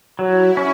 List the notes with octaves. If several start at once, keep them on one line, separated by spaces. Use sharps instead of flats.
F#3 E4
C#4